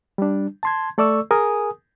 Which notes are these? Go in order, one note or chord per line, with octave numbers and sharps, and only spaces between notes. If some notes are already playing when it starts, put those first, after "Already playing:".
G3 D4
A5 C6 G#6
A3 A4 D5 C#6 E6
G#4 A#4 G#5 D#6